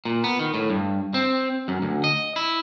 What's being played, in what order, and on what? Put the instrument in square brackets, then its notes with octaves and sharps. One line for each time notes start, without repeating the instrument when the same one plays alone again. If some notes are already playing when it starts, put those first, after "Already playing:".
[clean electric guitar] A#2
B3
D#3
A2
G2
C4
F#2
D2
D#5
E4